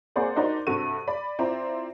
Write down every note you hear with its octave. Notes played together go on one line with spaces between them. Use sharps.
A#3 C4 G#4 C5 D5 F#5
D4 D#4 F#4 A#4 C5 D5
G2 C3 F#4 A4 D#7
D5 B5
C4 E4 F4 D5 A#5